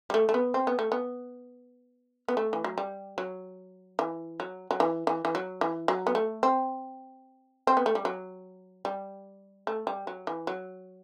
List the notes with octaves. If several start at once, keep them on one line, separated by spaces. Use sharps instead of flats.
G3
A3
A3
B3
C4
B3
A3
B3
B3
A3
E3
F#3
G3
F#3
E3
F#3
F#3
E3
E3
E3
F#3
E3
F#3
B3
A3
C4
C4
B3
A3
G3
F#3
G3
A3
G3
F#3
E3
F#3